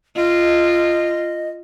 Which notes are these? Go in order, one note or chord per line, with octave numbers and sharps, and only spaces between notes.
F4 D#5